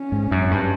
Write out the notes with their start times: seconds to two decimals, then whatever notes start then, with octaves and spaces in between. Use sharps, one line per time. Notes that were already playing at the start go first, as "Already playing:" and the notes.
Already playing: C#4
0.12 G#2
0.31 F#2
0.51 G2